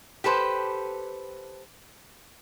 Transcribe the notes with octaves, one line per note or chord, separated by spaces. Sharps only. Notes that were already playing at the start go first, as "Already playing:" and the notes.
G4 A4 B4 C5